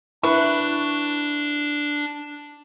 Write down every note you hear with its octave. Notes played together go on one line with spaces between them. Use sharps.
D4 E4 B4 C#6